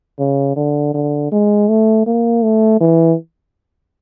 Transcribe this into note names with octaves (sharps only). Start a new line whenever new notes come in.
C#3
D3
D3
G#3
A3
A#3
A3
E3